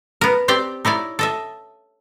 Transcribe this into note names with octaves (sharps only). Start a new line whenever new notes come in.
B3 A#4
C4 G4 D5 G5
D#4 E4 C#5 D5
A4 D#5 E5